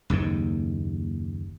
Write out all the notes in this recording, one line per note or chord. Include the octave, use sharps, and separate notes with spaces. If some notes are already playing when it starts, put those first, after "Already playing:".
F#1 D#2 G#2 D#3